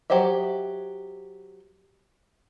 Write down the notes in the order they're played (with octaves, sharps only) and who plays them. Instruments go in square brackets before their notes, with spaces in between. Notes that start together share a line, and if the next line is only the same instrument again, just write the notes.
[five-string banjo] F#3 G4 C5 D#5 E5